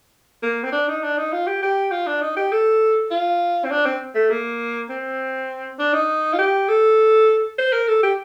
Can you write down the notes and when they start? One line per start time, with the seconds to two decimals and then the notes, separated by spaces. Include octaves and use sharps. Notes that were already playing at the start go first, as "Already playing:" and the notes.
0.43 A#3
0.63 C4
0.72 D4
0.88 D#4
1.03 D4
1.18 D#4
1.32 F4
1.47 G4
1.62 G4
1.91 F4
2.06 D4
2.22 D#4
2.37 G4
2.52 A4
3.11 F4
3.64 C4
3.71 D4
3.85 C4
4.15 A3
4.30 A#3
4.90 C4
5.79 D4
5.94 D#4
6.33 F4
6.38 G4
6.69 A4
7.58 C5
7.73 A#4
7.88 A4
8.03 G4